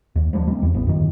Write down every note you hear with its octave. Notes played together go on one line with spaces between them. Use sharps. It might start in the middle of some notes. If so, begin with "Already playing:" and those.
D#2
F3 G3 A#3 D4
G3 A#3 C4
E2
A1 B3
F#2 D#3